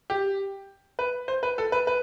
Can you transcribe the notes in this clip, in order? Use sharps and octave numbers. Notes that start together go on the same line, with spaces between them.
G4
B4
C5
B4
A4
B4
B4